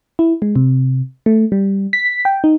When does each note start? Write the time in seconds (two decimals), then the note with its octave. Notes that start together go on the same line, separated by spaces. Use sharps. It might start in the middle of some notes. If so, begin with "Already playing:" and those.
0.19 E4
0.42 G#3
0.56 C3
1.26 A3
1.52 G3
1.93 B6
2.25 G5
2.44 D#4